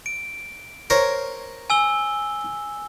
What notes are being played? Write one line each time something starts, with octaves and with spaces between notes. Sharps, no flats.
D7
A#4 C5 C#5
G#5 E6 G7